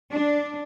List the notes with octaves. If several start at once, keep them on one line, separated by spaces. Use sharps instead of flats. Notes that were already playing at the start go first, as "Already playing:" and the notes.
D4